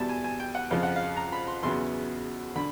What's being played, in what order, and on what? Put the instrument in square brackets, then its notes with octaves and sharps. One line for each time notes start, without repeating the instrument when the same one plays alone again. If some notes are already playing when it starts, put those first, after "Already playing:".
Already playing: [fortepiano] E2 B2 G3 A5
G#5
G#5
G5
F#5
F2 C#3 F3 F5
F#5
F5
A#5
B5
C6
E2 C#3 F#3 B3 C6
D3 B5